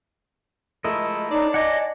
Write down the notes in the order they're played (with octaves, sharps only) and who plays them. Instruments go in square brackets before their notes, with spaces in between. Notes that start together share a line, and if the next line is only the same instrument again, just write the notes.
[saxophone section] F3 G#3 A3 [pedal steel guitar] E4 A#4 D#5
[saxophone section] D4 C#5 D5 [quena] D#4
[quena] D#5 [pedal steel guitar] F#5 G#5 D6